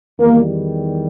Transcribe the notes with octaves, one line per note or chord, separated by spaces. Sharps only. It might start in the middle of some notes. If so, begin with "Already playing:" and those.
E2 D#3 G3 A#3